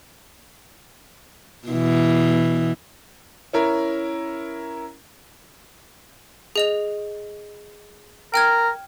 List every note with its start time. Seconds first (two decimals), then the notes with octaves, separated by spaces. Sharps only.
1.68 B2 E3
3.53 C#4 E4 A#4
6.56 G#4 D#5 F7
8.34 A#4 G5 F6 G#6